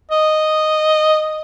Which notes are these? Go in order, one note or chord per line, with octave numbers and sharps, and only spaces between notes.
D#5